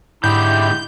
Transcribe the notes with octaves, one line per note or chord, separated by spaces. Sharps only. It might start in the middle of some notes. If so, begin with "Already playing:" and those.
G#2 D3 G#3 E4 G4 G6